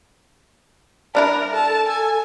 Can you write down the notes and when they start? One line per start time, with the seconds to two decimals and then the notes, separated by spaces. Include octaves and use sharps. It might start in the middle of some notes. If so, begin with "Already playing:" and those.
1.15 G3 D4 E4 A#4 D5
1.53 A4 A5
1.88 G#5